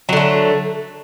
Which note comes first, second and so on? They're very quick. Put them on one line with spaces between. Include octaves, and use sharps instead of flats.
F#3 D3 A3